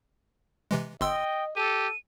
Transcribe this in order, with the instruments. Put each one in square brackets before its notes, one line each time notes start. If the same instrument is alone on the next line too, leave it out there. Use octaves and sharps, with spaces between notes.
[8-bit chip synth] C3 E3 G#3
[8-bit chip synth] G1 C6 E6 [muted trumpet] D#5 [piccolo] G5
[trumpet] G4 [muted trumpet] A4 [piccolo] D#7